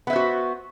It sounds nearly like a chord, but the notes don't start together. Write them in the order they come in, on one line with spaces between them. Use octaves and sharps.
B3 E5 C5 F#4